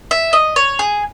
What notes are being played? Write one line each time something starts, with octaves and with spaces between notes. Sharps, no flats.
E5
D#5
C#5
G#4